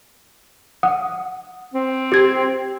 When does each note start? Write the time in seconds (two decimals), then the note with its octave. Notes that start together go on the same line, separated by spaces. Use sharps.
0.83 F#5 D#6
1.74 C4
2.12 G4 G#6